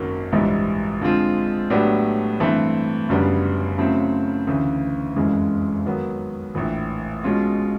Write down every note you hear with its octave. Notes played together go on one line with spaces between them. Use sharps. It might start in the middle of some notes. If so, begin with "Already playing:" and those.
Already playing: G#1 F#2 D#3 F#3 A#3
A#1 G#2 E3 G3
D3 F3 G#3 C4 F4
A2 F#3 B3 D4 G4
G2 E3 A3 C4
F#1 F#2 D3 G3 B3
C#3 F#3 A3 C4 E4
D2 C#3 E3
F#1 F2 C#3 E3 G#3
D#3 F#3 B3
A#1 A2 E3
B2 G#3 C#4 F4